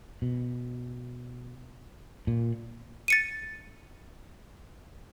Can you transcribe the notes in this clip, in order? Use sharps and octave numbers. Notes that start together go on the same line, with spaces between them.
B2
A#2
A6 C#7 D#7